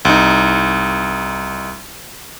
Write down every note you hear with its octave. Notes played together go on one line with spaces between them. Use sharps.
C2 D#4